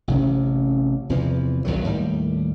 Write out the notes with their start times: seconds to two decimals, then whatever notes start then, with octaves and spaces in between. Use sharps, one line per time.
0.08 A1 C3 C#4
1.09 E2 C3 E3 F3
1.65 G#1 C#2 D#3 F#3
1.84 D#2 A2 G3